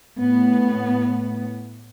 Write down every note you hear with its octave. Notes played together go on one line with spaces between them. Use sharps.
A2 B3